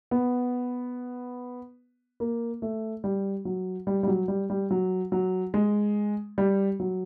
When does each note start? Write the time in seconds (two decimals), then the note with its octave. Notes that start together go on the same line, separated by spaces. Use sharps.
0.11 B3
2.20 A#3
2.62 A3
3.04 G3
3.45 F#3
3.87 G3
4.03 G3
4.07 F#3
4.28 G3
4.50 G3
4.71 F#3
5.12 F#3
5.54 G#3
6.38 G3
6.80 F#3